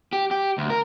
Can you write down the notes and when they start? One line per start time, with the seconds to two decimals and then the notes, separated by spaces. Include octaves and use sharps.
0.13 G4
0.31 G4
0.58 D2
0.70 A#4